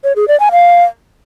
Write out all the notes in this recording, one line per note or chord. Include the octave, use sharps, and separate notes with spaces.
C#5
G#4
D5
G#5
F5